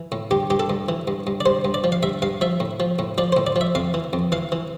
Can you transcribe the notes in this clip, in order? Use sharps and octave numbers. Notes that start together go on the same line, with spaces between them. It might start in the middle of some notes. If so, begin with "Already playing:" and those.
Already playing: E3
A2
G2 G4
G2 G4
A4
G2
E3
G2
G2
D5
G2 C5
G2
D5
F3
F5
G2 E5
G2 F5
F3 E5
A2
F3
A2
F3 D5
C5
A2
D5
F3
E5
F2 F5
E3
F2
E3 F5
E3